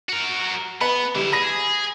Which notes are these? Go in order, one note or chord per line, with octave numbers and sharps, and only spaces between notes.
F#4 A#4
B3 B4
D3 G3 E4
G#4 B5 A#6